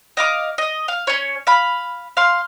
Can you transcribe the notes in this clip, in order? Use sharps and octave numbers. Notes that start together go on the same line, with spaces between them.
D#5 F5 D6
D#5
F5
C#4 C#5
F5 B5
F5 C6